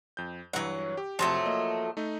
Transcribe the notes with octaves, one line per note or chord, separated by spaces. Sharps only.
F2 G6
G2 E3 F#3 F#5
G4
F2 C3 F3 F#3 A3
A#3 D#5
A3 D#4